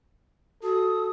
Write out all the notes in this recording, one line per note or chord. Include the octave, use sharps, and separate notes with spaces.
F#4 A4 D#6